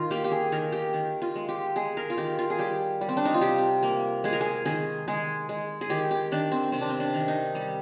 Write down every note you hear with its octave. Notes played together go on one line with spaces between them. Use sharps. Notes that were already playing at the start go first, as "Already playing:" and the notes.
Already playing: D#3 F4
A#3 G4
G4
G#4
D#3 A#4
G4
D#3
F4
G#3
G4
G#3 G#4
A#4
F4
D#3 G4
F4
G#4
G3 G4
G3
C4
D4
D#4
F4
C3 G4
A#3
G#3 G#4
A#4
G#4
D#3 G#4
G#3 G#4
G#3
G#4
D#3 G4
G4
D#3 D4
C4
C3 C4
D4
C4
D4
D#3
D#4
G3